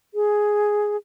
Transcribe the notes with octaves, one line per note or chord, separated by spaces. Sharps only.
G#4